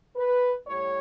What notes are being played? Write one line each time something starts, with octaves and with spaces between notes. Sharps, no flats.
B4
A2 G3 C#5